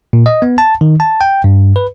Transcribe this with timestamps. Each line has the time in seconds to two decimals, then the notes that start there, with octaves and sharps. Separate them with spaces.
0.13 A#2
0.26 D#5
0.42 B3
0.58 A5
0.81 D#3
1.00 A5
1.21 G5
1.44 G2
1.76 B4